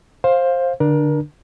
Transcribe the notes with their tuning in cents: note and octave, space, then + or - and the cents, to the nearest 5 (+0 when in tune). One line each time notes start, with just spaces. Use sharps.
C5 +15 F5 +5
D3 +0 D4 +20 A#4 +30